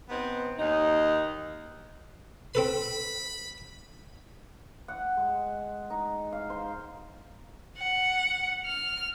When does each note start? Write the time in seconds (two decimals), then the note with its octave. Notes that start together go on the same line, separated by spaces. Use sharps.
0.09 B3 C4 D#4 B4
0.58 D#2 D#4
2.55 C4 A4 B4 B5
4.88 F#5
5.17 G#3
5.90 D#4
6.33 F5
6.50 C5
7.78 F#5
8.65 F6